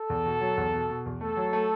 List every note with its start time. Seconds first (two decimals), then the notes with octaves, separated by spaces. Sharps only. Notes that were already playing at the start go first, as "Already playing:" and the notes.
Already playing: A4
0.10 E2
0.26 B2
0.41 F#3
0.57 E2
0.73 B2
0.89 B2
1.06 E2
1.21 A3 A4
1.37 F#3
1.53 A3